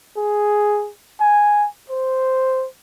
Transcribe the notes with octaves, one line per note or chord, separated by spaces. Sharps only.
G#4
G#5
C5